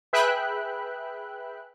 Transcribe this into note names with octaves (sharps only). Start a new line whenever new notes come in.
G#4 B4 E5 G5 B5 F#6